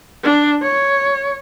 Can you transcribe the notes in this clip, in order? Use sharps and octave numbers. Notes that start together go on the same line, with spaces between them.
D4
C#5